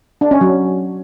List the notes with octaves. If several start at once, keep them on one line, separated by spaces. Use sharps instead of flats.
D4
C#4
F#3